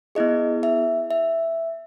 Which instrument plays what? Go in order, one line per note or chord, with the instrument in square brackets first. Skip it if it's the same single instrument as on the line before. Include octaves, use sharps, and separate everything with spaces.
[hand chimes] B3 E4 G#4 D#5
E5
E5